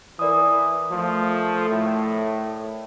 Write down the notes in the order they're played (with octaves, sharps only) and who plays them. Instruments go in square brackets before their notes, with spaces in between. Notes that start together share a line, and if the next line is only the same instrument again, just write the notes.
[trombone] E3 [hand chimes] A#4 D5 D#6
[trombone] F3 [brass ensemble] A3
[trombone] A2